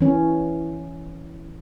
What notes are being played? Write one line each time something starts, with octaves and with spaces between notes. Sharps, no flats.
E3 C#4